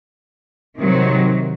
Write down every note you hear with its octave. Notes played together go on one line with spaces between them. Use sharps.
C3 D#3 F#3